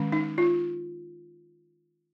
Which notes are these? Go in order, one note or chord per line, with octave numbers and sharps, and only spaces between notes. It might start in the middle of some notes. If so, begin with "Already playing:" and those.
Already playing: D#3 G#3 C#4
D#4
F4